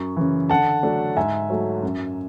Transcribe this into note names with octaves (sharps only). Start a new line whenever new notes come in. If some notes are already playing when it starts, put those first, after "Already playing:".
Already playing: F#2 C#6
C#3 E3
D3 F#5 A5
F#3 A3 D4
G#2 E5 G#5
F#3 A3
F#2